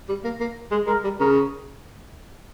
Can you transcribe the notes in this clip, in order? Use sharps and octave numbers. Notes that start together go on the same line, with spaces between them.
G3
A#3
A#3
G#3
G#3 A#4
G3
C#3 A#4